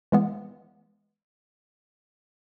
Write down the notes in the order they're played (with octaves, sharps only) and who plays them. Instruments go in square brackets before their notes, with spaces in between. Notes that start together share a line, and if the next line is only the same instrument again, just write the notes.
[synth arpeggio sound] E3 G#3 B3